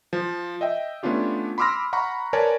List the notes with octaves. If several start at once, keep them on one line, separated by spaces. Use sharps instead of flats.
F3
D#5 E5 G5
A3 B3 C#4 D4 F4 G4
B5 C6 D6 E6 F6 A#6
F#5 A#5 B5 C#6
A#4 B4 C#5 D5 G#5 A5